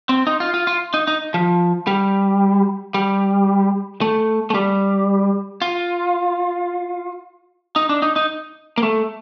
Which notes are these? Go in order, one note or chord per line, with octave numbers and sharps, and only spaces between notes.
C4
D#4
F4
F4
F4
D#4
D#4
F3
G3
G3
A3
A3
G3
F4
D#4
D4
D#4
D#4
A#3
A3